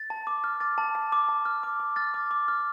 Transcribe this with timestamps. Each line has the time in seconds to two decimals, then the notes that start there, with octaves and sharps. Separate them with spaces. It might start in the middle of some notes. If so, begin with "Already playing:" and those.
Already playing: A6
0.10 A5
0.27 D6
0.44 F6
0.60 D6 A6
0.78 A5
0.95 A5
1.12 D6
1.29 A5
1.45 F6
1.63 D6
1.80 D6
1.96 F6 A6
2.14 D6
2.31 D6
2.48 F6